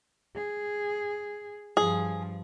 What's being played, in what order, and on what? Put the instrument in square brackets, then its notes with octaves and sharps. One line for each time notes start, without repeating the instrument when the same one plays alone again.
[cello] G#4
[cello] G2 F3 [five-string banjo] G#4